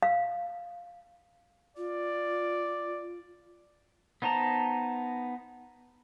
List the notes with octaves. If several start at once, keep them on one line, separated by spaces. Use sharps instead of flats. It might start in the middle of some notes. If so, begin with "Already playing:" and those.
F5
F4 D5
B3 D#4 C5 A5 A#5